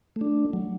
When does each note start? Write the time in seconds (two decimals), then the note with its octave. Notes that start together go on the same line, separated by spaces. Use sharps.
0.16 A3
0.21 D4
0.53 F#3